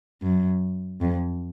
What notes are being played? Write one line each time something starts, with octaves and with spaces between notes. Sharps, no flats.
F#2
F2